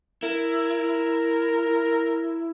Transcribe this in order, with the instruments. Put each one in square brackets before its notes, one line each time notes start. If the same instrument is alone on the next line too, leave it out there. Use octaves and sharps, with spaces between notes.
[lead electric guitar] E4 [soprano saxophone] A#4